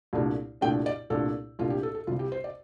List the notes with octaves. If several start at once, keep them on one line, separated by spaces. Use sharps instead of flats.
C2 A#2 A3 D4
C2 A#2 A3 D4 G5
D5
C2 A#2 A3 D4 A4
C2 A#2 A3 D4 F4
G4
A4
A4
C2 C3 G3 F4
G4
C5
D5